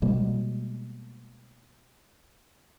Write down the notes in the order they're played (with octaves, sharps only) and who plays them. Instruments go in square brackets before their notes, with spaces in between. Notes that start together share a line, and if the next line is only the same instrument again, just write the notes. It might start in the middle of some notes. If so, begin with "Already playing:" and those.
[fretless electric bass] B2 G3 G#3 A#3